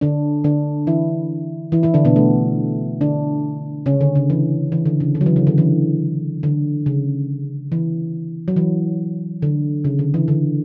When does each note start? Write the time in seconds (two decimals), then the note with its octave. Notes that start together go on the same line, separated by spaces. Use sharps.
0.01 D3 D4
0.44 D3 D4
0.87 E3 E4
1.72 E3 E4
1.83 E3 E4
1.94 D3 D4
2.05 B2 B3
2.16 A3
3.01 D3 D4
3.86 C#3 C#4
4.01 D3
4.15 C#3
4.30 E3
4.72 E3
4.86 D3
5.00 C#3
5.15 D3
5.21 F#3
5.26 E3
5.36 C#3
5.47 D3
5.58 E3
6.43 D3
6.86 C#3
7.72 E3
8.48 F#3
8.56 E3
9.42 D3
9.84 C#3
9.99 D3
10.14 E3
10.28 D3